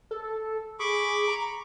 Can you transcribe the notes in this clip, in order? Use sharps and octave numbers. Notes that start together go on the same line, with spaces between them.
A4
G#4 B5 C#6 D6
A#5